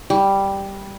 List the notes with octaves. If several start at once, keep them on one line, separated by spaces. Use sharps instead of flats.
G3